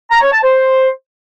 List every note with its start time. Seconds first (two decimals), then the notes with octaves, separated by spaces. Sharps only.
0.11 A#5
0.22 C#5
0.33 A5
0.44 C5